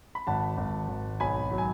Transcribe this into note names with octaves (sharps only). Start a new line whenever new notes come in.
B5
G#1 F#5 A5
G#1
G#1
B1 G#5 B5
F#3
G#5